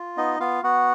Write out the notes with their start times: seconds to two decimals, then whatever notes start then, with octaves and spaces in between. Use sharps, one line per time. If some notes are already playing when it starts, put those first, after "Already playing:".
Already playing: F4
0.17 B3 D#4 D#5
0.40 B3 F4 F5
0.63 B3 F#4 F#5